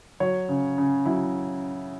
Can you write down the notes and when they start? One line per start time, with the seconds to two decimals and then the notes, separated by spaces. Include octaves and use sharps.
0.20 F#3 C#5
0.49 C#3
0.78 C#3
1.05 F#3 E4